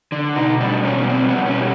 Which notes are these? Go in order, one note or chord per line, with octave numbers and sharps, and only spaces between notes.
D3
B2 D#4
G3 D4
B2 C#4
B3
G3 C4
B3
B2
C#4
G3